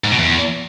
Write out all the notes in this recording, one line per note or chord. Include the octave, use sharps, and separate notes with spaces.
G#2
B2
E2